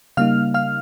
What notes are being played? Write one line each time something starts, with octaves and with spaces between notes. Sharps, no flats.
C#3 G3 A#3 D#4 F5 F6
F5 F6